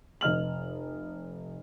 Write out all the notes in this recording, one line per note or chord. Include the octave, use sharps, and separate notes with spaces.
F1 D#5 F6 F#7